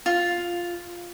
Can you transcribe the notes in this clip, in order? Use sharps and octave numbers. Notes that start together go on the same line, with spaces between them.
F4